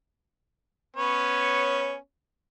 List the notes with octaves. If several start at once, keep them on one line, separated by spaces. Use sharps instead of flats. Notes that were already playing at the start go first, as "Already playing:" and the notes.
B3 C#4 C#5